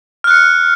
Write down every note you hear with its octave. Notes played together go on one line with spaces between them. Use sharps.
F6 F#6 C#7